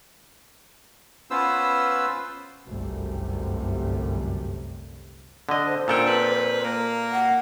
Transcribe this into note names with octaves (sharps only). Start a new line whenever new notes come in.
B3 C#4 F4 B4 C5 E6
G1 C2 F#2 C3 G3 A3
D3 D#5
C5
A#2 C#4 D4 A4 G5
F2 B4
A#3
F#5